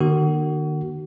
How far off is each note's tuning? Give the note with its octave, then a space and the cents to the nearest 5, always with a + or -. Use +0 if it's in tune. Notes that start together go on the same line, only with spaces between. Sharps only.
D#3 -40 A#3 +35 F#4 +30